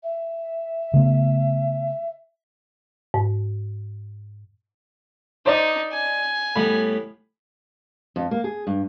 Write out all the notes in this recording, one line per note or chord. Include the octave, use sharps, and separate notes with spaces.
E5
C#3 A3 B3
G#2
D#4 C5 D5 D6
G#5
A2 G3 B3 B5
F2
A#3
G#4
G2